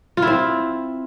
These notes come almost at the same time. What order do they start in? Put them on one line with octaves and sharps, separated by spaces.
F4 E4 C4